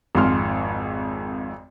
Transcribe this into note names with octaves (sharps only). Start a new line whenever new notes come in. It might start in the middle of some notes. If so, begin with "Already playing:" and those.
G#1 F2 G#2 C6 F6